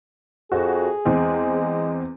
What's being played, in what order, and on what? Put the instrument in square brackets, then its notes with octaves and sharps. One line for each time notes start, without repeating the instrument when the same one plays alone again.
[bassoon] F2 [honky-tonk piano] F#4 [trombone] G#4
[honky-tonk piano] E2 C4 [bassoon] G#3